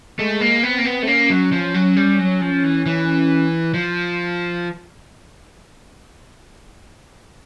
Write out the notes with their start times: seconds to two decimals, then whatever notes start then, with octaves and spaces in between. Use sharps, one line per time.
0.19 G#3 A3
0.41 A#3
0.63 B3 C4
0.78 A#3
0.85 B3
1.03 A3 C4
1.07 A#3 C#4
1.30 F#3
1.52 F3
1.74 F#3
1.97 G3
2.19 F#3
2.41 F3
2.63 E3
2.86 E3
3.74 F3